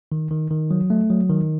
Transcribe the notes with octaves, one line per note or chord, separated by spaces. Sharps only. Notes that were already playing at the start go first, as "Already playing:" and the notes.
D#3
D#3
D#3
F#3
A3
F#3
D#3